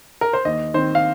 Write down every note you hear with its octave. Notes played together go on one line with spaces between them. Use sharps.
A#4
C5
D#2 D#5
D#3 C4 C5
F5